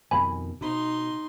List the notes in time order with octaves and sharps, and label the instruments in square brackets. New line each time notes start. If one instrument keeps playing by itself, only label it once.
[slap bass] F2 B2 D#3 [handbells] G#5 B5
[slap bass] B2 [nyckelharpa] D#4 C6